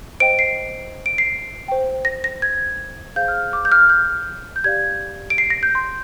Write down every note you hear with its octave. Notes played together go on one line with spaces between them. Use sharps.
C5 D#5 G5 D7
C7
D7
C7
C5 G5
A#6
A#6
G#6
G#4 C5 F5 G6
F6
D6
G6
F6
G6
G6
G4 D5 F5 G#6
D7
C7
A#6
G6
C6